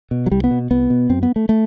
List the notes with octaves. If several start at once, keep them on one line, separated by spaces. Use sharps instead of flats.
B2
F#3
C2 G3
B3
B2
C2 B3
B2
F#2 C4
B3
A3
A3